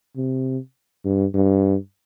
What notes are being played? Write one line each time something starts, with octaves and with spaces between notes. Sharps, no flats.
C3
G2
G2